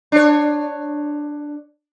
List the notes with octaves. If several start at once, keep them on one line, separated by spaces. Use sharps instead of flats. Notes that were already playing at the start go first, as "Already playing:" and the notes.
D4 C#5